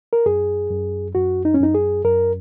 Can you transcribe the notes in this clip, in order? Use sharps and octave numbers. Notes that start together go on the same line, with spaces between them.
A#4
F#2 G#4
F#2
F#2 F#4
D#4
C#4
F#2 D#4
G#4
F#2 A#4